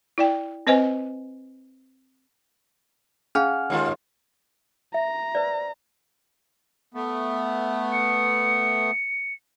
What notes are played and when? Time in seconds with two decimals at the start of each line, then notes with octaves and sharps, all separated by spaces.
0.18 E4 D5 G5
0.67 C4 B4 C5 D#5 G#5
3.35 C#4 G#4 F5 F#5 G#5 F6
3.70 D#2 G#3 F4
4.94 E5 A#5
5.35 B4 C5 D5
6.94 A3 B3
7.92 C#7